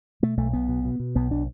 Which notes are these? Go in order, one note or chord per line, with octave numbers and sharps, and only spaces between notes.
B2 A3
B1 A3
B1 B3
B2
B2
B2
B1 B3
B2 D4